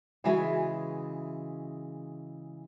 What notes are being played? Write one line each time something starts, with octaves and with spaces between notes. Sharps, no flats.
C#3 E3 G#3 F#4 E5 G#5